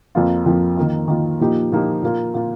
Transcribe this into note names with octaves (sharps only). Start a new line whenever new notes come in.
F2 F3 A#3 F4
F2 F3 A#3 F4
D#3 A#3 F4
D#3 A#3 F4
A#2 F3 A#3 D#4 G4
A#2 F3 A#3 D#4 G4
A#2 A#3 F4
A#2 A#3 F4